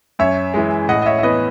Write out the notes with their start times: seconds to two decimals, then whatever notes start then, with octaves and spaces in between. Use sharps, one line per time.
0.19 F#2 C#5 E5
0.54 E3 G#3
0.89 A2 D#5 F#5
1.02 D#5
1.06 C#5 E5
1.19 E5
1.23 E3 B3 B4 D#5